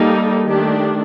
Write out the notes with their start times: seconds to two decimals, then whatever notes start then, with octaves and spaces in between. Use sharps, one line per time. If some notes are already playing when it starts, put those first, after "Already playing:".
Already playing: G3 A#3 D#4 A4
0.46 D#3 A3 D4 G4